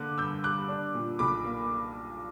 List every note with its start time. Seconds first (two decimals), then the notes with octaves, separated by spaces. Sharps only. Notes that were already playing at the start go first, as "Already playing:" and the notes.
Already playing: D3 A#3 D6 F#6
0.18 G2 E6 G6
0.44 G3 D6 F#6
0.68 D4
0.94 A#2
1.19 B1 B5 D6
1.45 A#3